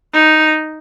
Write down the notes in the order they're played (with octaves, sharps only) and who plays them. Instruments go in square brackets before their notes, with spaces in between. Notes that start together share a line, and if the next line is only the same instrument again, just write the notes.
[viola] D#4